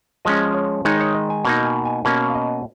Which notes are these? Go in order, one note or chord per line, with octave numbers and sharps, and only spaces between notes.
F3 G#3 C#4 D#5
C#5
D#3 G#3 D#4 C#5
C#5
D#5
G#5
B2 A#3 D#4 A#5
G#5
G#5
B2 A#3 C#4
F5
D#5